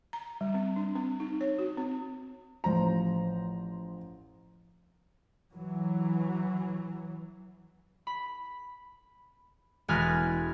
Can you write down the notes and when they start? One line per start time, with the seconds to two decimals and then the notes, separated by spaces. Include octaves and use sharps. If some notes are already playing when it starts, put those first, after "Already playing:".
0.13 A#5
0.41 G3
0.54 C4
0.76 D4
0.95 C4
1.20 D#4
1.41 C#5
1.59 F#4
1.77 C4
2.64 A1 F3 C5 A#5
5.53 E3 F#3
8.07 B5
9.88 E1 G#3 B4 G#5 F6 A6